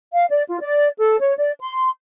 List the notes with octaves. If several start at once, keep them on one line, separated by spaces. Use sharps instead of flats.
F5
D5
F4
D5
A4
C#5
D5
C6